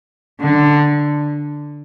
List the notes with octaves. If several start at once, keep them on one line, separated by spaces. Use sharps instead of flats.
D3